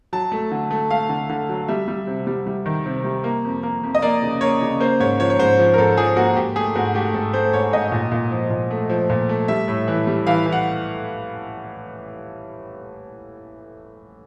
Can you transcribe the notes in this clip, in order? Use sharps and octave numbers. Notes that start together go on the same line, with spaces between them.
F#3 A5
A3
D3
A3
A3 F5
D3
D3
F#3
G3 E5
G3
C3
G3
G3
D#3
C3
G3
A#3
F2
A#3
F2
D#5
A#3 D5
C#3
A#3 C#5
C#3
A#3 C5
G#2 C#5
F3 C#5
C#5
G#2 C5
F3
A#4
G#2 A4
F3 G#4
A#3 F#4
G#2 G4
A3 G#4
G#2 F#4
A3 G4
G#2 A4
A3 C5
G#2 C#5
G#2 D#5
A#2
A#2
F3
A#2
A3
F3
A#2
A3
G3 E5
A2
E3
G3
E3 F5
E3
F#5